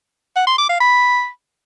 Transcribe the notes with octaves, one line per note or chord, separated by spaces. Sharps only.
F#5
C6
D6
F5
B5